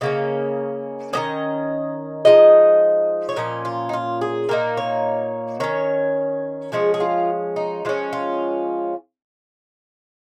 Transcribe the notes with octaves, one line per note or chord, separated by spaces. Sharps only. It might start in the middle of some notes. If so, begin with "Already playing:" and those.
C#3 A#3 C#4 D#5
D#3 A#3 C#4 D#5
F3 G#3 D#4 D#5
C#5
A#2 F3 C#4 D#5
F4
D#4
F4
G#4
A#2 A#3 D#4 A#4
C#5
D#3 C#4 C#5
F3 G#3 C#4 G#4
G#4
F4
D#4
F3 G#3 C#4 F4
F4